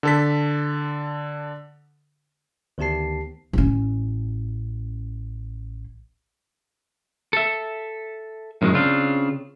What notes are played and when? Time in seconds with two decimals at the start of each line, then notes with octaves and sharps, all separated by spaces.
0.03 D3 A4 B6
2.78 D2 D#3 B3 G4 A5 C7
3.53 A1 C#4
7.33 A4 E5
8.62 F#2 A2 D#3 F#3 G#3
8.73 C#3 C4 D4 F4